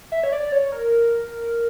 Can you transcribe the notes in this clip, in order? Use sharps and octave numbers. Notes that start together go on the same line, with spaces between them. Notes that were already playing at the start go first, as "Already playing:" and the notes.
E5
C#5
D5
C#5
A#4